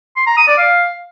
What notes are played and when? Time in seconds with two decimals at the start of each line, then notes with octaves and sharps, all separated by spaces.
0.16 C6
0.27 A#5
0.37 D#6
0.47 D5
0.58 F5